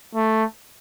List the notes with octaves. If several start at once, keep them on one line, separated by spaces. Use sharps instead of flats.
A3